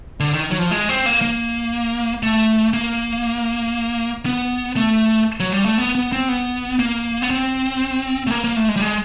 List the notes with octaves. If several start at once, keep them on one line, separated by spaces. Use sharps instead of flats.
D3
D#3
F#3
F3
G#3
C4
A#3
A#3
A3
A#3
B3
A3
F#3
G3
A3
B3
B3
C4
B3
A#3
B3
C4
A3
A#3
A#3
A3
G#3
G3
G#3